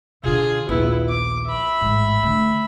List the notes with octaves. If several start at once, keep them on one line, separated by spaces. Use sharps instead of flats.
B2 D3 F4 G#4
A#1 D#2 B3 E4
D6
E5 B5
A1 G#2
D3 A3